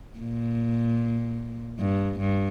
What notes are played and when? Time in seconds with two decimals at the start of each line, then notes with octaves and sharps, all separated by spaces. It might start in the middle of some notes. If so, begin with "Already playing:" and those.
0.19 A#2
1.79 G2
2.19 G2